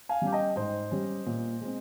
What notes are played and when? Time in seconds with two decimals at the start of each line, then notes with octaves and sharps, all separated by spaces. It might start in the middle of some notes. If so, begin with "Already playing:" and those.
0.09 F5 G#5
0.22 G3 C#4 G4
0.33 D#5 G5
0.56 G#2 C5 D#5
0.91 G3 C#4 G4
1.26 A#2
1.61 G#3 C4